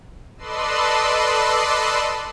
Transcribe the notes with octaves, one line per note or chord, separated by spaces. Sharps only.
A4 B4 D5 D#5 C6 E6